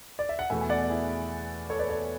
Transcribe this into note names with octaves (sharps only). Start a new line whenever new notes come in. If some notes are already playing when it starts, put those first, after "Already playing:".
D5
E5
F#5
E2 B2 A3 E5 G#5
G#5
D5 F#5
E4 G#4
A4 C#5
B4 D5
A4 C#5